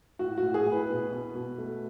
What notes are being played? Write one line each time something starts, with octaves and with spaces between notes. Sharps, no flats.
A2 F#4
A2 F#4
G#4
A2
B4
B2
B2
B2
A3